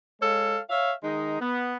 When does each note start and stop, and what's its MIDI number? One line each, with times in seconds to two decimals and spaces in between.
0.21 0.59 56
0.21 0.59 69
0.21 0.59 73
0.21 0.59 77
0.70 0.93 73
0.70 0.93 76
0.70 0.93 77
1.03 1.39 51
1.03 1.39 56
1.03 1.39 63
1.40 1.76 59